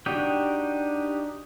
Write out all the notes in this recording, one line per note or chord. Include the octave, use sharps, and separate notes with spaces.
D4 D#4 F#4 G4 G5